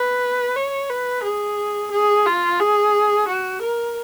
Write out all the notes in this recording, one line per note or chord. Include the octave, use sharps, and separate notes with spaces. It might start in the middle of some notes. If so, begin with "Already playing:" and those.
Already playing: B4
C#5
B4
G#4
G#4
F4
G#4
F#4
A#4